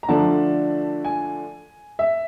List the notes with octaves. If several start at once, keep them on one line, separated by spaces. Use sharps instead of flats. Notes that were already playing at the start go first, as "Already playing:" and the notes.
A#5
D3 F3 A3 D4 A5
G#5
E5